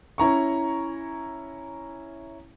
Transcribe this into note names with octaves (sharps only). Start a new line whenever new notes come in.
C#4 E4 A#5 C#6